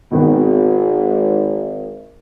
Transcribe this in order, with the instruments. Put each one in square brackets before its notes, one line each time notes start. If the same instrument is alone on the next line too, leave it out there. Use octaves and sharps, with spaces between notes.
[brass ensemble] G#1 [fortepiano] B2 D#3 B3